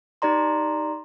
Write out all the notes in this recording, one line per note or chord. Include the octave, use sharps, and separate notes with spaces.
D#4 G4 D5 A#5 C6